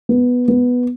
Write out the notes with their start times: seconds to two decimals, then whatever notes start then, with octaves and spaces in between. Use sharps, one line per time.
0.09 B3
0.48 B3